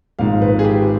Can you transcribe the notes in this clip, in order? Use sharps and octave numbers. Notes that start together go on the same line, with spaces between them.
G#1 G#2 F3 F5
B4
G#4
G4